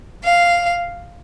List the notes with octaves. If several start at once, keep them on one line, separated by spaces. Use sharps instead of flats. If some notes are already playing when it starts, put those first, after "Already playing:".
F5